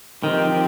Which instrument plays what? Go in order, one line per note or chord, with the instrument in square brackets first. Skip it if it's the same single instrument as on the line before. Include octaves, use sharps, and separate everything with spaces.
[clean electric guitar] D#3 [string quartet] F3 C4 G4